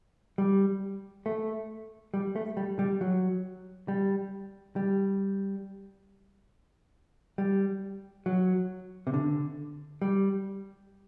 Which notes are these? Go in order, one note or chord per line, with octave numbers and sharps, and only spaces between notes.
G3
A3
G3
A3
G3
G3
F#3
G3
G3
G3
F#3
C3
D3
G3